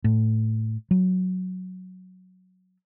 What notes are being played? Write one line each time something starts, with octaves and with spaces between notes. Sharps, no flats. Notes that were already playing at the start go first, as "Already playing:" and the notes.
A2
F#3